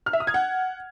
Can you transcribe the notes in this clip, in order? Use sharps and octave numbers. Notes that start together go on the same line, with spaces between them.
F6
E5
D#6
G#6
F#5